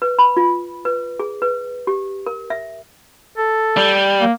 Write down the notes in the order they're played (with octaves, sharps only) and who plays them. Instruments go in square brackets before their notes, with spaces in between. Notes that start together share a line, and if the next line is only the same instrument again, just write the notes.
[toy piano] B4
B5
F4
B4
G#4
B4
G4
A#4
E5
[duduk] A4
[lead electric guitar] G3
[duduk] A#3